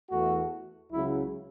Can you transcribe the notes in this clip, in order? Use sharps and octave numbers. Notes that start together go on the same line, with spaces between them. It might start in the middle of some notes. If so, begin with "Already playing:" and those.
E2 E3 A3 F#4
C#2 C#3 F#3 E4